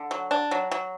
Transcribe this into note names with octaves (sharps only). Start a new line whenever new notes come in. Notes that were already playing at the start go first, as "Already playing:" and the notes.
Already playing: D3
F#3
D4
F#3
F#3